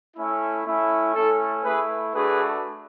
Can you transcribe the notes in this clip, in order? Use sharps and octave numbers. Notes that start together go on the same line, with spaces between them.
A3 C#4 E4
A3 C#4 E4
A3 C#4 E4 A4
A3 E4 G#4 B4
A3 D4 F#4 G#4 B4